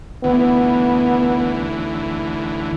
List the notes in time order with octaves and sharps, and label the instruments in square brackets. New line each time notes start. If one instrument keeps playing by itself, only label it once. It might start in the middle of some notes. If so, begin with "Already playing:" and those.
[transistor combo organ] D2 E3 [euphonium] B3